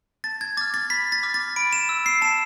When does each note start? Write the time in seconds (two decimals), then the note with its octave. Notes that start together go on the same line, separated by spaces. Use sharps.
0.24 A5 A6
0.41 G#6
0.57 D6 A6
0.61 F6
0.74 A6
0.90 B5 B6
1.12 A6
1.23 D6 F6
1.34 A6
1.56 B5 D7
1.73 E7
1.89 E6
2.06 C7
2.22 A5 E7